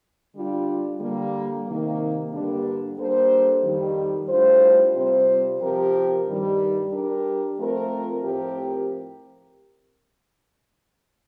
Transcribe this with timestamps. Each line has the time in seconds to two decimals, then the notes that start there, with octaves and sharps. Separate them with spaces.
0.34 D3 G3 D4 F4
1.00 D3 G3 A#3
1.66 C3 D#3 A#3
2.31 G2 D3 G3 A#3 D4
2.97 G3 A#3 D4 A4 C5
3.64 F2 D#3 G3
4.29 A2 G3 D4 F4 C5
4.94 C3 G3 C4 F4 C5
5.60 C3 F3 C4 G4 A#4
6.26 G2 D#3 G3
6.92 G3 D4 G4 A#4
7.58 F3 A3 C4 F4 A#4
8.23 A2 F3 C4 G4 A#4